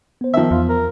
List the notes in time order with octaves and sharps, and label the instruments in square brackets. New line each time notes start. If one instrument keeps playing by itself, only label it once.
[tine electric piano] B3 C5
[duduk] D#3 [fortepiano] F3 E5
[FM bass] E2 [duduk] F4
[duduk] A#4